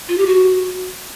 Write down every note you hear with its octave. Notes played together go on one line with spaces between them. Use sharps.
F4
G4
F#4